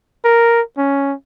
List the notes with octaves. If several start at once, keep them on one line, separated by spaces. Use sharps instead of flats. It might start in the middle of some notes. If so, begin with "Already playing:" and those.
A#4
C#4